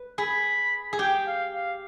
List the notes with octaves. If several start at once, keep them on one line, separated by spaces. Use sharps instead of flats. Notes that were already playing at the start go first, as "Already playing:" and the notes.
Already playing: B4
G#4 B5
G#4
G4 G5
F5
F5